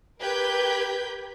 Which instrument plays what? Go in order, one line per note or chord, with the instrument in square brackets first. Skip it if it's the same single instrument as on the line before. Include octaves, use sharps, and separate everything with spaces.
[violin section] G4 A#4 B4 G6 G#6 B6